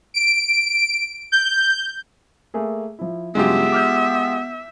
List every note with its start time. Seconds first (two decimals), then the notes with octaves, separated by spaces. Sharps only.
0.14 D7
1.32 G6
2.54 A3 A#3 G#4
2.99 F3 E4
3.35 G2 C#3 F#3 G#3 B3 F4 G4 E5
3.72 D6 F6 G6